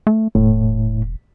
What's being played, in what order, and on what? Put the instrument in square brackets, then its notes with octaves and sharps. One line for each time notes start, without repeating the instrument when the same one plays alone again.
[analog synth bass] A3
[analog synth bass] E1 [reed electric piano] A2